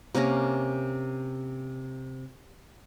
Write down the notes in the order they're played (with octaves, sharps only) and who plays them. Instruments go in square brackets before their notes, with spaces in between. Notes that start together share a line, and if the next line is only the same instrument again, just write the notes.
[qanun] C3 A#3 C#4 A#4